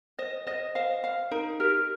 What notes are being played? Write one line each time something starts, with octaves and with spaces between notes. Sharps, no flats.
C5 D#5
C5 D#5
C5 F5
F5
D#4 A#4
G4 A#4